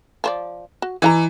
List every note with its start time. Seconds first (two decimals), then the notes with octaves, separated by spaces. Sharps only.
0.24 F3 C5 D5
0.82 F#4
1.02 E3 D#5 F#5 A#5